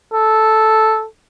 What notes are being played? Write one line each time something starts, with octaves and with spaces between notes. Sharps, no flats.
A4